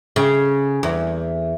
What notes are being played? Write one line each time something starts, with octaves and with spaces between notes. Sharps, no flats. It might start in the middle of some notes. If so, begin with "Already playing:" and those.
C#3
E2